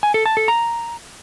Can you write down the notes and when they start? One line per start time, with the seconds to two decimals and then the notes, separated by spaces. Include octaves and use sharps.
0.03 G#5
0.14 A4
0.26 A5
0.37 A4
0.48 A#5